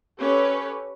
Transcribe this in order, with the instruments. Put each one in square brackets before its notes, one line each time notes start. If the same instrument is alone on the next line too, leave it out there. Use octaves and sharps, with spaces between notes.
[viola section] C#4 G4 A4 B4 C#5